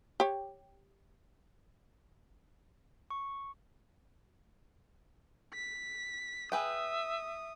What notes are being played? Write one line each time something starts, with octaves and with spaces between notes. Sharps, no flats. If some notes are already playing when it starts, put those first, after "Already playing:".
G4 C#5
C#6
B6
G#4 B4 E5 G5 D#6